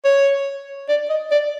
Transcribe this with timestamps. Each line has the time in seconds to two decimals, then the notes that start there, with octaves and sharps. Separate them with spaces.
0.05 C#5
0.89 D5
1.10 D#5
1.31 D5